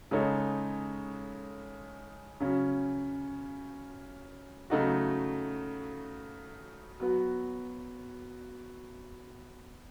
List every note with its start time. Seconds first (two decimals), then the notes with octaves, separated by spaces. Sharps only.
0.11 C#3 G#3 D#4 A4 C#5
2.40 C#3 F#3 C#4
4.70 C#3 F#3 A3 D#4 F#4
7.00 F#3 B3 F#4